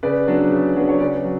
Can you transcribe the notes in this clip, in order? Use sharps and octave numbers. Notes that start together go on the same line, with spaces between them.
C#3 B4 D5
F#3 B3 D4
C#3
F#3 B3 D4
C#5
C#3 B4 D5
F#3